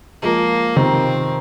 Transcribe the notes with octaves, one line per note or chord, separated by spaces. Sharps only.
F3 G#3 A#3
C3 D#3 C4